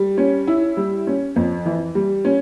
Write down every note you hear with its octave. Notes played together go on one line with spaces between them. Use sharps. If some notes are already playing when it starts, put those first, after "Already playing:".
Already playing: G3
C#4
E4
G3
C#4
F2
E3
G3
C#4